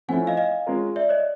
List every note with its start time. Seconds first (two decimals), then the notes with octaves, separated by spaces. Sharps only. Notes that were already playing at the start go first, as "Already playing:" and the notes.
0.08 F3 A3 C#4 E4 F#5 G#5
0.27 D#5 F5
0.37 D#5 F5
0.67 G#3 C#4 F4 A#4
0.96 D5 E5
1.09 C#5 D#5